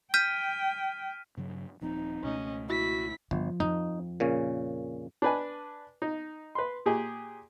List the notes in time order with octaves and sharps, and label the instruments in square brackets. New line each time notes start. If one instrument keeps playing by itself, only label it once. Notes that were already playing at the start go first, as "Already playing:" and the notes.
[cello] G5 [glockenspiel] F6 B6 D#7 [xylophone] G6
[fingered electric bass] G2 C#3 F#3
[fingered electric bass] D#1 F3 C4 [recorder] D#4
[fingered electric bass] C#2 B2 A3 [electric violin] C#4 D#5
[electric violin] E4 B6 [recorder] F#4
[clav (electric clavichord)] G1 [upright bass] F3
[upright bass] F2 [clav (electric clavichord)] D#4
[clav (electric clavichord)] A#2 C#3 C#4
[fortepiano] D4 B4 G#5
D#4
B4 C6
A#2 G4 G#4